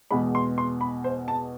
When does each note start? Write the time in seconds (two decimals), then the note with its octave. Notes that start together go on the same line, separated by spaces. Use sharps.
0.11 E2 B2 G#3 B5
0.35 C6
0.58 C6
0.81 B5
1.04 C5
1.28 A5